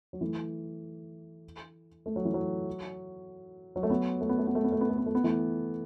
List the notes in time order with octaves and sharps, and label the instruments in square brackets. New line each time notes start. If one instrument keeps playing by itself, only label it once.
[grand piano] F#3
E3 A3
A3
F#3
E3
F#3
F#3
A3
F#3 B3
A3
B3
A3
B3
A3
B3
A3
B3
A3
B3
A3
B3
E3 A3